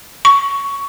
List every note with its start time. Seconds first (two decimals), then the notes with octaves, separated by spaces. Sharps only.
0.25 C#6